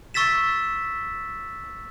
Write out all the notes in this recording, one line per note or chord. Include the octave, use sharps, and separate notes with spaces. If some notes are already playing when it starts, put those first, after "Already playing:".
C#6 E6 A6 B6 E7